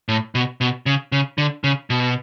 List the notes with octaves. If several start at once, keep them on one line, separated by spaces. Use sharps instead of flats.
A2
B2
B2
C#3
C#3
D3
C#3
B2